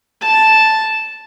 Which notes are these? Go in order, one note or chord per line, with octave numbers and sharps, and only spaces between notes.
A5